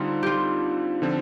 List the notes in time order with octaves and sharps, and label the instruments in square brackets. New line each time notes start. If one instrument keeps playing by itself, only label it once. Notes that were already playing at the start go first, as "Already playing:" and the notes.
Already playing: [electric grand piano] D3 G3 C4 [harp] D#4 F4
[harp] F4 G4
[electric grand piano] D3 F3 C4